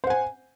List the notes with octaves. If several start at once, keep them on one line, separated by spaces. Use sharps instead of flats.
C5 F#5 G#5